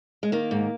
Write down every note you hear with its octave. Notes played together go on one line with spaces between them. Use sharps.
G#3
D#3 A#3
G#2